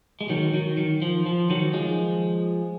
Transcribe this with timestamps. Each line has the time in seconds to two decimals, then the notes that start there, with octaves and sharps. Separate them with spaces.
0.21 G#3
0.29 D#3 F#3
0.54 D#3 F#3
0.77 D#3
1.02 F3
1.26 F3
1.50 D#3 F#3
1.73 F3 G#3